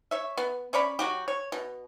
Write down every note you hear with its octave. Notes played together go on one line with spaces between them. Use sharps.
C#5 E5
B3
C#4 C#5 D5 B5
F#3 F#4 G4
C#5
B2